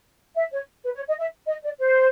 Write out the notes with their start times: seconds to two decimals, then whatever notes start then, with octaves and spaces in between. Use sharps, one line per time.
0.36 E5
0.52 C#5
0.84 B4
0.95 C#5
1.07 D#5
1.19 E5
1.47 D#5
1.63 D5
1.79 C5